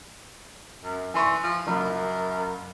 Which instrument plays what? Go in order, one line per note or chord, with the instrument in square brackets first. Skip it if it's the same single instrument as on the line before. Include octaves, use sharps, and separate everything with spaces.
[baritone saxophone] F#2
[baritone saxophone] E3 [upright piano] G#5 C6 C#6
[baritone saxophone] F3
[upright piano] F#1 B5 [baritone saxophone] F#2